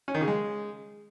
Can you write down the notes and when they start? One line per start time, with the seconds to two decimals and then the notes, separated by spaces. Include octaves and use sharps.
0.08 C#4
0.14 D#3
0.21 C#3
0.28 G#3